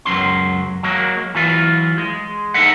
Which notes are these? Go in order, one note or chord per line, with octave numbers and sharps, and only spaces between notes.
C#2 F#2 F#3 C#4 C6
F#3 G#3 A#3
E3 F#3 F4
G#3
D#4 E4 A4 D#5 E5 F#5